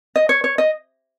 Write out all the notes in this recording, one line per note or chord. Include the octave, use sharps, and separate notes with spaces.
D#5
C#5
C#5
D#5